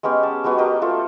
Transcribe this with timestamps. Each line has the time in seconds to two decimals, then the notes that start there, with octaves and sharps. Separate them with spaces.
0.03 G#3 B3 C#4 G4
0.23 A5
0.44 F#3 G#3 B3 F#4
0.58 G4 A#4 B4 D#5
0.82 A3 F4 A4 C#6